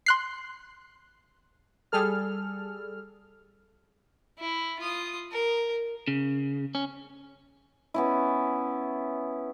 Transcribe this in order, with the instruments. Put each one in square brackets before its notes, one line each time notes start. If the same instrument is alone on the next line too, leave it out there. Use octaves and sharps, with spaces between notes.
[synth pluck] C6 F#6 C7
[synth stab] G3 G#4 A4 F6
[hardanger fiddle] E4
F4 D#6
A#4
[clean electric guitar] C#3
C#4
[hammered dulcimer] B3 C#4 E4